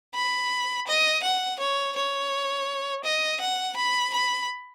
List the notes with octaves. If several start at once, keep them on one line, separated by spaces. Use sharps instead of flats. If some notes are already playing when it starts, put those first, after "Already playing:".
B5
D#5
F#5
C#5
C#5
D#5
F#5
B5
B5